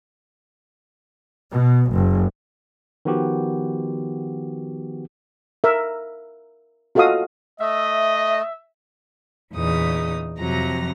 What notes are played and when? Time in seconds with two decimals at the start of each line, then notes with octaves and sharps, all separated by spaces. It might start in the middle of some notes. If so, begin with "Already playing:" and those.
1.52 B2
1.92 F#1
3.05 D#3 F3 B3 F#4 G4
5.64 A#4 E5
6.95 F4 F#4 A4 D#5 F5 D#6
7.60 A3 D#5 E5
9.54 E2 A#2 C#3 D#4 D#6
10.40 F2 C3 F3 F#3 A#5 A#6